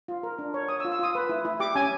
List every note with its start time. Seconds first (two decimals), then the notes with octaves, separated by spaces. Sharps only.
0.08 F4
0.23 A#4
0.39 D4
0.54 C#5
0.69 C#5 D#6
0.80 E6
0.85 F4
0.92 E6
0.99 F4 D#6
1.15 B4
1.29 E4
1.45 E4
1.60 G4 D6
1.75 C#4 G#5